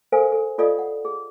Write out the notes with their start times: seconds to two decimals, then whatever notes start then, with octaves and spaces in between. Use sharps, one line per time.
0.12 A4 A#4 C5 F5 G#5
0.32 A4
0.58 F4 A4 D5 D#5 F5 D#6
0.78 F#5
1.05 G#4